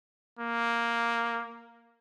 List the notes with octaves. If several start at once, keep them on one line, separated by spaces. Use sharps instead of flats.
A#3